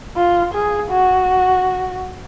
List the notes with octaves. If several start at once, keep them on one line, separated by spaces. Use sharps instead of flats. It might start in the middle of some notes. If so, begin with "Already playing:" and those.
F4
G#4
F#4